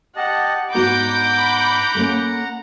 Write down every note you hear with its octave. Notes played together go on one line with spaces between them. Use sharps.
G4 D#5 F#5 A5
G#2 B3 F#4 F#5 A#5 B5 D6 G6
A3 A#3 C#4